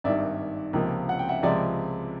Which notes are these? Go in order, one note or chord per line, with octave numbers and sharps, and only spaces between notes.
G#1 G2 D#3 D5 E5
C#2 C3 F3 A#3
F#5
G5
E5 F#5
C#2 C3 F3 G#3 D5 E5